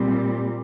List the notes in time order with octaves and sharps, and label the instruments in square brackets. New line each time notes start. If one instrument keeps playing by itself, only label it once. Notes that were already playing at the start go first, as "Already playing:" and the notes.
Already playing: [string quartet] A#2 G3 C4